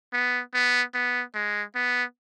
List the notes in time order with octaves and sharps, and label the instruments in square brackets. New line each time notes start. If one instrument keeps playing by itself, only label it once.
[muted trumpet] B3
B3
B3
G#3
B3